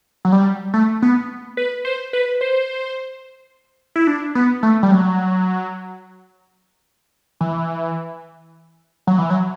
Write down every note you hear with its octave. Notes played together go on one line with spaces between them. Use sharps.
F#3
G3
A3
B3
B4
C5
B4
C5
E4
D4
B3
A3
G3
F#3
E3
F#3
E3
F#3